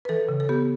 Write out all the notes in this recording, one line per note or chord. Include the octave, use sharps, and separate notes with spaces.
B4
E3 A4
C#3
A4
B3 G4